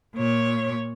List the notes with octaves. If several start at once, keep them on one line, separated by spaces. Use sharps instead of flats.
A#2 C#5